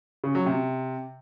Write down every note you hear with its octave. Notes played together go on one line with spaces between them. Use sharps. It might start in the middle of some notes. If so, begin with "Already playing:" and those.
C#3
F#3
C3